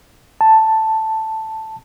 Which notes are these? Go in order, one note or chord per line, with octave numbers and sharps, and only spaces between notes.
A5